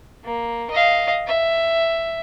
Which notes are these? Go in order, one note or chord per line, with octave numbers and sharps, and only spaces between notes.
A#3
D#5 F5
E5